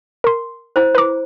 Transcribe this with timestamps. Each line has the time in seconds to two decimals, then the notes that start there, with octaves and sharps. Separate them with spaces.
0.24 A#4 C6
0.76 E4 C5
0.95 B4 A#5 D6